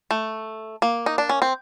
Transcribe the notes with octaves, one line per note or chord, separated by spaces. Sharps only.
A3
A#3
D#4
D4
C#4
C4